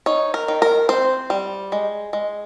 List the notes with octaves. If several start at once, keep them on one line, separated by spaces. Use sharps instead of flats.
D#4 C#5
A#4
D#3
A#4
C4 C5
G3
G#3
G#3